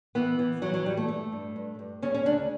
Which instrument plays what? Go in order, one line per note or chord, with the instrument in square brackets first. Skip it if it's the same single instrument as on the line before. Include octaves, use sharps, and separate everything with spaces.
[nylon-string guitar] E3 B3
E3
E3 F#3
F#3
E3 G3
A3
G2 A3
G2
G2
G2
C#3 C#4
C#4
D2 D4